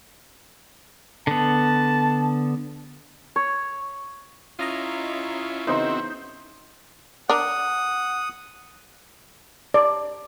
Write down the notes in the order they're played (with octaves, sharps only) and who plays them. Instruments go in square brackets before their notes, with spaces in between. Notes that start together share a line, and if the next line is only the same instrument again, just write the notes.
[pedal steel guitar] D3 B3 [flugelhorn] A5
[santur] C#5
[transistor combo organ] C#4 E4 [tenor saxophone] F4 [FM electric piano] D#5 A#5 D#6
[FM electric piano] C#3 E3 B3 [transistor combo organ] C4 F#4 E5 [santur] D#4 C5
[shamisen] D4 A#4 [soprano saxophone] F#5 [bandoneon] D#6
[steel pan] D5